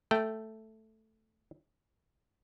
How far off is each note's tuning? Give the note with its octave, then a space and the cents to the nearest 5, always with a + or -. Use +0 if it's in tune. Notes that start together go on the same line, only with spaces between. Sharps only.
A3 +0 G5 -10